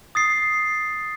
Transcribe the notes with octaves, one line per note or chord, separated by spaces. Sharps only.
D#6 A6 C7